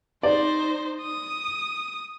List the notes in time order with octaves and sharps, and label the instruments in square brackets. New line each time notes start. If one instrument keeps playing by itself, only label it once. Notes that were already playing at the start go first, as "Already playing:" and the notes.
[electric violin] D#4 C5 [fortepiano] D5
[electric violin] D#6